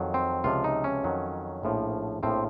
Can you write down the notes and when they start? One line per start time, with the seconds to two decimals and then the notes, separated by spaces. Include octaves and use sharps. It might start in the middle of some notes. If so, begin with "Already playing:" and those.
Already playing: F2 D#3 F#3
0.14 C4
0.44 C#2 C3 F3 F4
0.64 D#4
0.84 C#4
1.04 F2 D#3 F#3
1.63 A#1 A2 F3
2.23 A#1 A2 F3 C4